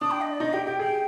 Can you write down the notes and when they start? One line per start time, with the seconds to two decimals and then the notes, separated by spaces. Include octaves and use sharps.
0.01 D4 D#6
0.11 G5
0.21 D#5
0.31 D5
0.40 D#4 D#5
0.53 G4 G5
0.66 G4 G5
0.79 G#4 G5